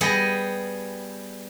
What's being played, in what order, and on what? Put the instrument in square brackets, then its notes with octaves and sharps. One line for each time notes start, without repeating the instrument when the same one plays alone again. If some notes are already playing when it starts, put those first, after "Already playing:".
[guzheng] G3 B3 G#4 D#5